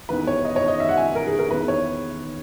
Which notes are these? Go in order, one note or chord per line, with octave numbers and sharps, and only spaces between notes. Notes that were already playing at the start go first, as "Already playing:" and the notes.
E2 D#3 B4
C#5
D#5
C#5
D#5
E5
F#5
G#5
A#4
G#4
A#4
E2 D#3 B4
C#5